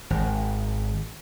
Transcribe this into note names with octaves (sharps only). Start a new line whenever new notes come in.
G#1